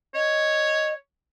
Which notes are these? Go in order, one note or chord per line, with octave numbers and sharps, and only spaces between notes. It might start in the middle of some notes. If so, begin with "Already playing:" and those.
C#5 D#5